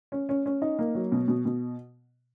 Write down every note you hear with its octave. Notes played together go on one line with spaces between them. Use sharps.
C#4
C#4
C#4
D#4
A#3
F#3
B2
B2
B2